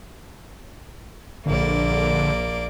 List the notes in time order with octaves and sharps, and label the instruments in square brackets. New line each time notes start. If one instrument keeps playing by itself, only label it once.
[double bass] A#1 [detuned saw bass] D3 [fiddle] A#3 D5